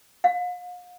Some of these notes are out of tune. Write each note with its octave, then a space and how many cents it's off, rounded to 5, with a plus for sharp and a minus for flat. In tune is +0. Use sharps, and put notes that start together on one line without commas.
F5 +40